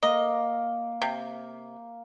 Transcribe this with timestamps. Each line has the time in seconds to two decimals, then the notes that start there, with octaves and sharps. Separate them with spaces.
0.03 A#3 D#5
1.02 C3